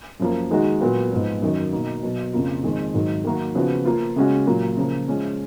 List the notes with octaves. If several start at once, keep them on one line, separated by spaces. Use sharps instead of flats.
F#2 F3 A#3
D#3 G#3 D#4 F#4
A#2 F#3 B3 F#4
G#2 F3 B3
F#2 D#3 F#3
B2 A#3 D#4 F#4
B2 F#3 B3
F2 C#3 F3 A#3 F4
F2 D#3 G#3
G#2 D#3 F#3
D#3 F#3 A#3 D#4 F#4
C#3 F3 B3 F#4
F3 A#3 F4
C#3 G#3 C#4 F#4
A#2 F#3 A#3 F4
C#3 F3 A#3
F3 G#3 C#4